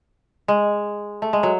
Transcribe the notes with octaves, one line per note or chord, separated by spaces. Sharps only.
G#3
A3
G#3
F#3